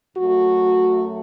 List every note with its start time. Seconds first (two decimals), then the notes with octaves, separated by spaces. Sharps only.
0.16 F#2 F#3 A3 F#4